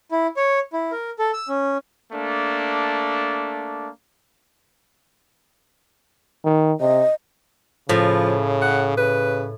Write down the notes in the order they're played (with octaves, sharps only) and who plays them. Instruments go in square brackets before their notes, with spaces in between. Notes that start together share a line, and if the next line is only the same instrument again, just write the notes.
[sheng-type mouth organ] E4
C#5
E4
A#4
A4
E6
C#4
[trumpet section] A3 A#3 D4
[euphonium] D#3
[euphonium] C3 [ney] D#5
[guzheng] A2 [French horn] C#3 [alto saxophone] F3
[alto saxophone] F#5
[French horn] C#3 [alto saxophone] B4